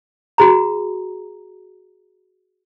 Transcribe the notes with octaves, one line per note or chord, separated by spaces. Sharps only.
F#4 G#4 A#5